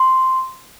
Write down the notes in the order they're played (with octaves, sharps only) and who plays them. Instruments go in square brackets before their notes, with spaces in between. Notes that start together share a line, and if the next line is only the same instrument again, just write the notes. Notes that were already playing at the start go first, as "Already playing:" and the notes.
Already playing: [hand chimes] C6